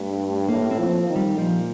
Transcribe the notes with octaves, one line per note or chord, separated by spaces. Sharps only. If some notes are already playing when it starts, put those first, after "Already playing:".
Already playing: G2 A3
A2 A#3
C4
F3
D#3
G3
A#2 F3